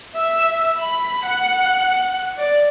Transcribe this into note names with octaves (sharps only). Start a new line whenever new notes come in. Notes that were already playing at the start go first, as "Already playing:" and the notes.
E5
B5
F#5
D5